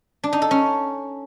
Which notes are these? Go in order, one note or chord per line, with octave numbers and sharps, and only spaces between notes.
D4
D#4
A4
C#4